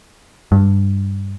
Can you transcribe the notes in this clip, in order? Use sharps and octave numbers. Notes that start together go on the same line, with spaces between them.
G2